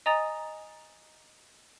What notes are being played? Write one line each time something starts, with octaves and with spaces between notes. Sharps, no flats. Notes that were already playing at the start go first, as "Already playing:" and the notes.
D#5 G#5 A#5 D#6 A6